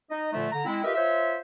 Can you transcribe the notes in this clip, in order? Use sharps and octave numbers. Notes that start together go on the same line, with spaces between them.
D#4 D#5
A#2 D3 F3 A3
D3 A#5
G#3 C4 E4
F4 G4 A#4 B4 D#5 E5
F4 C5 C#5 E5